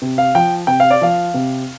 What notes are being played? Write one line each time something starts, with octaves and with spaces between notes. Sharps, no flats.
C3
F5
F3 G5
C3 G5
F5
D5
F3 F5
C3